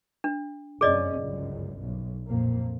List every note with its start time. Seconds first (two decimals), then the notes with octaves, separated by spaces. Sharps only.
0.24 D4
0.81 F1 F#2 C#4 G#4 D5 D#5
1.18 G1 C#2 F#2
1.81 B1
2.27 F2 A#2 A#3